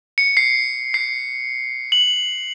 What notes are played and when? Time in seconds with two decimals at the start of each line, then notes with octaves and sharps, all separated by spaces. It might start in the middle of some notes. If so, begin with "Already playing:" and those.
0.18 C#7
0.37 C7
0.94 C7
1.92 F#7